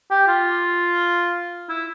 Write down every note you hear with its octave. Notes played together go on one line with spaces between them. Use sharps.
G4
F4
E4